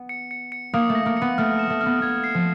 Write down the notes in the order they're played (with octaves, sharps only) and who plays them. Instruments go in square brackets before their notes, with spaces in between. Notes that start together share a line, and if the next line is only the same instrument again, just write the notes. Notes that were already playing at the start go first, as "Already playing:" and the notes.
Already playing: [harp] B3
[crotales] C#7
C#7
C#7
[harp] A#3 [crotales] D#6
[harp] A3
[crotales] A#6
[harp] A#3
[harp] B3 [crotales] C#7
[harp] A3 [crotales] F6
[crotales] E7
[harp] A3
[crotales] F6
[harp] B3
[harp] B3 [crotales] G#6
[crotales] C7
[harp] F3